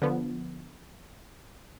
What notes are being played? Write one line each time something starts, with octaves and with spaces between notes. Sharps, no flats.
D3 F3 B3